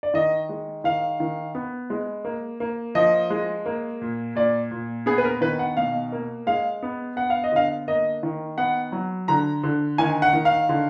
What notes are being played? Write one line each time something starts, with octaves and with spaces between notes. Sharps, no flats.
D5
D#3 D#5
G#3
D#3 F5
D#3
B3
G#3
A#3
A#3
F3 D#5
G#3
A#3
A#2
A#2 D5
A#2
B3 G#4
B4
A#4
D#3 B4
F#5
B2 F5
A#3
G#3 F5
B3
B3 F#5
F5
D#5
D3 F5
A#3 D#5
D#3
B3 F#5
F#3
D3 A#5
D3
D#3 G#5
F#5
D#3
F5
D3